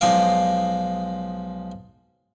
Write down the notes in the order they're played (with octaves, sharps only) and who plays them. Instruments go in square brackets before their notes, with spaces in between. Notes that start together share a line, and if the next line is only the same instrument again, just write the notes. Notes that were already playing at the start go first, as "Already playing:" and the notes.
[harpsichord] B1 F3 G#3 D#4 D5 F5